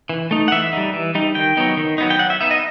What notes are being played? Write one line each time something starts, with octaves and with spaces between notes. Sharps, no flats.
E3
A3 D#4
F#5
E3 E5
G3 D#4
E3
G3 D#4
D#3 G5
F#3 B3 D#4
D#3
F#3 B3 D#4
G5
F#3 F#5
E5
B3 D#4 E5
D#5